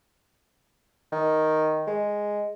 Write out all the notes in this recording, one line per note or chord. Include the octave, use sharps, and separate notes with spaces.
D#3
G#3